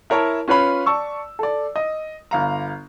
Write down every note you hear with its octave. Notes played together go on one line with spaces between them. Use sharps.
E4 A#4 C#5 A5 A#5
C#4 F4 B4 C#5 B5
D5 A5 C#6 E6
A4 D5
D#5
G1 F5 A#5